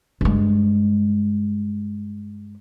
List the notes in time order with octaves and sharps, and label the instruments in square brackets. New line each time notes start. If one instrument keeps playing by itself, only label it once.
[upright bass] G2 G#3